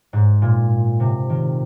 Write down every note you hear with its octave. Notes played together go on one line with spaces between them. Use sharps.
G#2
A#2
C3
D#3